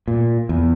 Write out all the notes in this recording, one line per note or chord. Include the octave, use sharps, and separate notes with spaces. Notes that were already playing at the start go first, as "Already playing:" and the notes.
A#2
E2